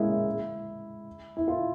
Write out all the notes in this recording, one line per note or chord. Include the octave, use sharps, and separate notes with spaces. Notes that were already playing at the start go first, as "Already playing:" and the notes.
Already playing: G#3 A#3 C#4 E4
E4
F4